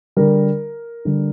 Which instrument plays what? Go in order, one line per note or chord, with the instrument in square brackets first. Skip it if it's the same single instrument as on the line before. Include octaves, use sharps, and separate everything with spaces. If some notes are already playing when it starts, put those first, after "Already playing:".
[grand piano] D3 G3 A#4
D3 G3